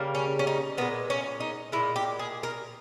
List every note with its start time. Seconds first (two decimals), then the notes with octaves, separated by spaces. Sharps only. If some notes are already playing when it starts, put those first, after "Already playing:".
Already playing: C#3 G3 A#3
0.15 C#4
0.39 C#4
0.47 D#4
0.77 A#2 G#3 B3
1.10 C#4
1.40 D#4
1.72 A#2 G#3 E4
1.96 G4
2.19 G#4
2.43 A#4